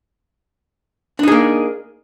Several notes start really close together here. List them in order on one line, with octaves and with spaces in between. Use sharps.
D4 D#4 G#4 A#3